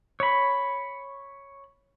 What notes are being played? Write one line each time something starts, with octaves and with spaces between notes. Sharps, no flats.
C#5 B5